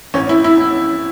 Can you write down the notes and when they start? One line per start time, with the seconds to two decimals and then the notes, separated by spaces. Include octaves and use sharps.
0.14 A1 C#4
0.29 E4
0.44 E4